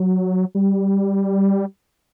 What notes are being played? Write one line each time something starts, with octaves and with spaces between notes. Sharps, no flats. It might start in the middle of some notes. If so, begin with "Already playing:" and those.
Already playing: F#3
G3